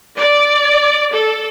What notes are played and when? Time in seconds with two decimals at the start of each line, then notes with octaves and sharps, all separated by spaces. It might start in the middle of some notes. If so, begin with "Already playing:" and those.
0.17 D5
1.13 A4